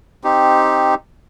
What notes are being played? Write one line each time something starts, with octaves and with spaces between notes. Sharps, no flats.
C4 D#4 G4